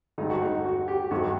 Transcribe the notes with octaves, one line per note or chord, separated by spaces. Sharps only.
G2 D3 A3 D#4
F#4
D#4
F#4
G4
G2 D#3 A3 F#4